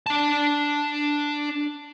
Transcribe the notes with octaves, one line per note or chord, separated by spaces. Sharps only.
D4 A5